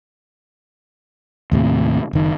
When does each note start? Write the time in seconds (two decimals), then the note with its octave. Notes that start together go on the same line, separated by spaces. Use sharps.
1.52 D#2 A2 C3
2.13 F#1 D#3